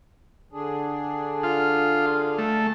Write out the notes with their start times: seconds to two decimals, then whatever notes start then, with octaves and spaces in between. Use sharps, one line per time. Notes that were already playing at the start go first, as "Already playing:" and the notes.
0.52 D3 D4 G#4
1.43 F4
2.38 A3